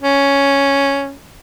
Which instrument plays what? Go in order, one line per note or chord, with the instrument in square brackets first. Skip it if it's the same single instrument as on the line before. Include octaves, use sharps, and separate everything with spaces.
[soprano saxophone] C#4